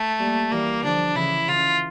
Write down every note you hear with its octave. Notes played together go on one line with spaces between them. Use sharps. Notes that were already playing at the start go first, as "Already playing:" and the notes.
Already playing: A3
G3 A#3
E3 G3 A#3
D3 F3 D4
C#3 E3 E4
C#3 E3 F4